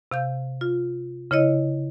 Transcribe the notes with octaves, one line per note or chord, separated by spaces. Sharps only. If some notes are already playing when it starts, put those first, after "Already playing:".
C3 F5 G6
F4
C#3 E4 C#5 D#5